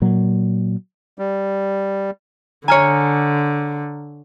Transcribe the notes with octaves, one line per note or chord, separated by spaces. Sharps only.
A#2 F#3
G3
D3 C#5 G#5 A#5 F6 C#7